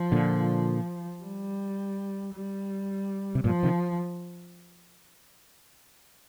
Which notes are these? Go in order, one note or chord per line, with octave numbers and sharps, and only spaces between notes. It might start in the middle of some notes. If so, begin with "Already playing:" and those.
Already playing: F3
A#2 D3
G3
G3
C3
G2 A#2 F3
C3 D#3